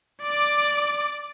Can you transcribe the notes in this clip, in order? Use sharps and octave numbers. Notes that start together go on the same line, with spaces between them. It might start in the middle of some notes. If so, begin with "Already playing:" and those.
D5 D6